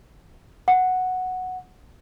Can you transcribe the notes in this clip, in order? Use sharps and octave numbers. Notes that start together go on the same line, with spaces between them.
F#5